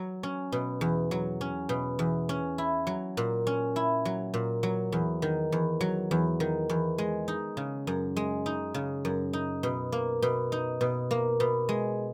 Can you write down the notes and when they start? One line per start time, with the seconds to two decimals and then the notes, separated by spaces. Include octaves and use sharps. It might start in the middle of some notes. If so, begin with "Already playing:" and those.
Already playing: F#3
0.23 C#4
0.52 B2
0.81 E2
1.11 F#3
1.41 C#4
1.69 B2
1.99 E2
2.29 C#4
2.58 E4
2.87 F#3
3.17 A#2
3.47 C#4
3.76 E4
4.05 F#3
4.34 A#2
4.63 F#3
4.92 E2
5.22 D#3
5.52 E2
5.81 F#3
6.11 E2
6.40 D#3
6.69 E2
6.98 G#3
7.28 D#4
7.57 C#3
7.87 F#2
8.16 G#3
8.46 D#4
8.74 C#3
9.05 F#2
9.33 D#4
9.63 B2
9.92 A#3
10.22 B2
10.52 D#4
10.81 B2
11.11 A#3
11.40 B2
11.69 G#3